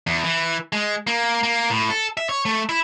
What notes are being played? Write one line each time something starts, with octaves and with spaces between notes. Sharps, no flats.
E2
E3
G#3
A#3
A#3
A2
A4
E5
C#5
A3
E4